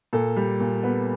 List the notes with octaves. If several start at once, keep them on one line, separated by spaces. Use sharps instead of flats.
A#2 A4
G3
A#2
B3